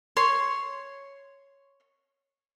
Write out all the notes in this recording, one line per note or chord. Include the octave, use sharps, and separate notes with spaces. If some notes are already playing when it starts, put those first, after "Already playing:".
C#5 C6